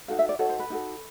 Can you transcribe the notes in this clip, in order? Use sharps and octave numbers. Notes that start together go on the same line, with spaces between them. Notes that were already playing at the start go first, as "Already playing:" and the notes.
D#4 F#4 A4 F5
E5
D5
D#4 F#4 A4 C#5
C5
B4
D#4 F#4 A4